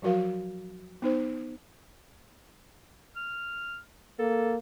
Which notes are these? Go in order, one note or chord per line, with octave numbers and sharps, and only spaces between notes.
F3 F#3 F#4 A#4 F5
B3 D#4 C5
F6
A#3 A4